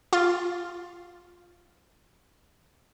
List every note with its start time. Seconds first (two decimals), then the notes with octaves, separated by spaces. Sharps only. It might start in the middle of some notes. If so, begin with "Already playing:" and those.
0.13 F4 C6 A6